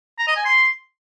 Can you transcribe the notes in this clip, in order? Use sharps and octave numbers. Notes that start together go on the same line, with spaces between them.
A#5
D#5
G#5
C6